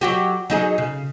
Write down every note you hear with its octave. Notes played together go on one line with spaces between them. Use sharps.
F#3 F#4 G4
F#3 D#4 G#4
C#3